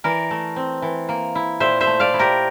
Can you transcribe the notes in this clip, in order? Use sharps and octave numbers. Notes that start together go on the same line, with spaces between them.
E3 A#4 D5
A3
C4
E3
A#3
E4
A#2 C5 E5
C5 E5
A3
D5 F5
E4
G4 A#4